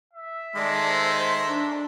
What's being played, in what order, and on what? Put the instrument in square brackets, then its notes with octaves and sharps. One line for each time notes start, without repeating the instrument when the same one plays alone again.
[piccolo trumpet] E5
[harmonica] D#3 A3 C6 [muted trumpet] G#3 [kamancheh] D5 A5
[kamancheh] C5
D4